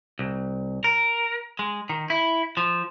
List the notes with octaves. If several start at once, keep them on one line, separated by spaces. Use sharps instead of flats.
C2
A#4
G#3
D#3
E4
F3